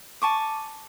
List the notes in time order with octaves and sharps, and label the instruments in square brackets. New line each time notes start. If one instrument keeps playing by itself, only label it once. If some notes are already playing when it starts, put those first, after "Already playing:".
[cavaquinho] G#5 A5 C#6 D6